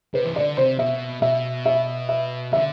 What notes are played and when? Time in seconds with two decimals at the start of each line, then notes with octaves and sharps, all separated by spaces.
0.14 C3 B4
0.25 E3
0.36 D3 D5
0.57 C3 C5
0.79 B2 E5
1.22 B2 E5
1.66 E5
2.09 E5
2.53 D3 E5